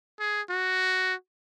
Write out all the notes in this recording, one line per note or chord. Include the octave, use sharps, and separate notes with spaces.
G#4
F#4